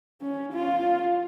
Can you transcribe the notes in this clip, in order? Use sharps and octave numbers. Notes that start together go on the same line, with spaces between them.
C#4
F4